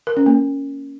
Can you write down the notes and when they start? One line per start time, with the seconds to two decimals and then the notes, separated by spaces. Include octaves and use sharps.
0.07 A#4
0.17 C#4
0.26 A#3